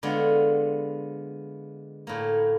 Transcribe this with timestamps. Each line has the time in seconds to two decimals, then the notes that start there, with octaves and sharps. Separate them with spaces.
0.03 D3 G#3 B3 E4 F4
2.07 A2 A#3